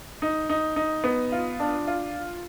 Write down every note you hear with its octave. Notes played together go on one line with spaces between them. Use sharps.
D#4
D#4
D#4
B3
F4
D4
F4